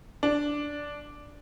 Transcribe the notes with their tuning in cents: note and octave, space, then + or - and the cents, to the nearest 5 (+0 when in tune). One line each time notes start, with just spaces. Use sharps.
D4 -5